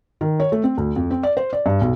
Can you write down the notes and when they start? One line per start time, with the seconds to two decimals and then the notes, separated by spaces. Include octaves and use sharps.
0.21 D#3
0.40 C#5
0.52 A3
0.64 C4
0.77 D2
0.96 F2
1.11 C4
1.23 D5
1.37 C5
1.53 D5
1.66 G2
1.81 B1